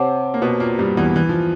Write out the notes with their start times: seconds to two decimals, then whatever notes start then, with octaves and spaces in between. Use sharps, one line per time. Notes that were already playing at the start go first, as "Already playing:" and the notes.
Already playing: C3 C4 C#5 F#5 A5 D6
0.34 A#3
0.42 B2 B3
0.60 A#2 A#3
0.79 G2 G3
0.97 E2 E3
1.16 E3
1.29 F3